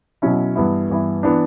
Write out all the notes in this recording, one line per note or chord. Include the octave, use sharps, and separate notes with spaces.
B2 F#3 C#4 E4
G2 E3 B3 E4
G2 E3 B3 E4
E3 B3 D4